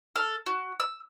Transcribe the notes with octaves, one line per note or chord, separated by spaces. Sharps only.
A4 F6
F#4
E6